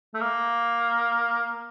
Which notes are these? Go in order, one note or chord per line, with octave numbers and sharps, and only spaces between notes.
A3
A#3